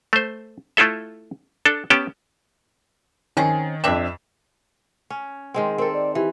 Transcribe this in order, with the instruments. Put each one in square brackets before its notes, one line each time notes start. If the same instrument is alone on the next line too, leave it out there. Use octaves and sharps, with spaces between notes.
[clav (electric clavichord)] A3 C5
A3 E4 F4 A4 E5
D4 A4
B3 C#4 G4 G5 A5
[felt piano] D#3 [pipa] C4 C#4 G#4
[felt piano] F2 E7 [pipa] C4 D4 E5
[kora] C#4
D#3 G#3 C4
[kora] C4 A4 [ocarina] A#4
[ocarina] D5
[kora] E3 [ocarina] G4